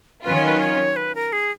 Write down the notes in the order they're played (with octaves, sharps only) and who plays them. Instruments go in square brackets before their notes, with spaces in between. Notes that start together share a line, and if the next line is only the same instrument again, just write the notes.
[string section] D#3 F#3 C#4 F4 [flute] B4
[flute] C#5
B4
C#5
B4
A#4
G#4